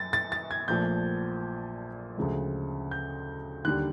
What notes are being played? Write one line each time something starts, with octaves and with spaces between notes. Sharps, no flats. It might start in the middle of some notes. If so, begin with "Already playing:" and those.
Already playing: F#2 A6
A6
A6
G#6
A#1 A#2 F3 A3 G6
D2 C#3 F3 G#3
G6
D#2 D3 G3 F#6